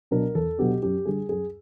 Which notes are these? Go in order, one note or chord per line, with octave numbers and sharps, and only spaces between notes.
B2 F#3 B3 D4 A#4
E2 A4
B2 F#3 B3 D4 G4
F#2 G4
D3 G3 G#4
F#2 G#4